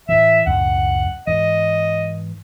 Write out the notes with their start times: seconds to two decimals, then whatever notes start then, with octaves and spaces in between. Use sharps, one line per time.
0.09 A2 E3 E5
0.47 C#2 F#2 A2 F#5
1.27 G#2 E3 D#5